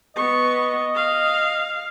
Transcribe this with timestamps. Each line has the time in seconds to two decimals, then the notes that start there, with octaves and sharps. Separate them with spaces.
0.16 B3 D#5 C#6
0.95 F5